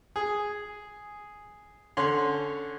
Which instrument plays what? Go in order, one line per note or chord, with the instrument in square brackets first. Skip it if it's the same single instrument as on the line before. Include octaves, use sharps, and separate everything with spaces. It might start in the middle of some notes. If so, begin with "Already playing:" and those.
[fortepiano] G#4
D3 C#4 C6